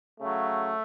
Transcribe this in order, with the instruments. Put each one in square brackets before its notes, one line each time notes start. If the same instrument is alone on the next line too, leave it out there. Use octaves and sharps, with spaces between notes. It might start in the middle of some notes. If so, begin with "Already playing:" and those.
[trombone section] C#3 F#3 A3